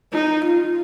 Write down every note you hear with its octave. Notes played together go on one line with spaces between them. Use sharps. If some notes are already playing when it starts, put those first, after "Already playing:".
D#4
F4